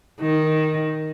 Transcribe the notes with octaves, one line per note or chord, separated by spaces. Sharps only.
D#3